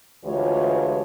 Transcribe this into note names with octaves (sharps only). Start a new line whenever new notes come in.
D2 E3 G#3 F4 G4 C#5